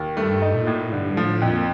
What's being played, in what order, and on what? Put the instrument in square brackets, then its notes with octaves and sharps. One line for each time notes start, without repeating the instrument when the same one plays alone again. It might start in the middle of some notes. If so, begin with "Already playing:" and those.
Already playing: [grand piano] D#2
[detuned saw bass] G2 [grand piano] A3
[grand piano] D#4
[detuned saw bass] A#2
[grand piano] A2
[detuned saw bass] G2 [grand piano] D3
[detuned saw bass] A2 [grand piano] F3
[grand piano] F2 [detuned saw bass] A#2